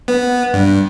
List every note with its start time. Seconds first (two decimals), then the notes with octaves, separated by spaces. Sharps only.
0.08 B3
0.53 G2